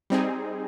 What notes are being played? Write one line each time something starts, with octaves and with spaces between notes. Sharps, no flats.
G3 C4 D#4 G#4